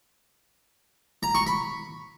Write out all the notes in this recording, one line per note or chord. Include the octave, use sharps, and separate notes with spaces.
A#5
C#6
B5